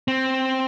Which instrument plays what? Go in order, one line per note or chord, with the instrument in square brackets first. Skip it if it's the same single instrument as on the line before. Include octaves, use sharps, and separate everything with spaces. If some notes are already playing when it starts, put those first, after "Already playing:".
[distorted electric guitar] C4